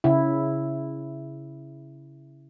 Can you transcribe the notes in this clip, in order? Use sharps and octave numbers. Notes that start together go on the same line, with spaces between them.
C#3 E4